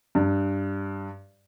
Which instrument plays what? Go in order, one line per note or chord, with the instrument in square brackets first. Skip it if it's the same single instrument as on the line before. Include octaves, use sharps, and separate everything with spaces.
[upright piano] G2